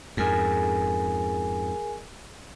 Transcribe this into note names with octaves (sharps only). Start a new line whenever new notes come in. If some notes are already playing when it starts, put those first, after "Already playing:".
F2 G#2 G#4 A#4 G#5